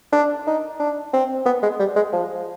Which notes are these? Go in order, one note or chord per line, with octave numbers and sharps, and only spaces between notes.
D4
D#4
D4
C4
B3
G#3
G3
G#3
F3